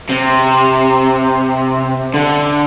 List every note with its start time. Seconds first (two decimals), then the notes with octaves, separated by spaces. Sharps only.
0.09 C3
2.14 D3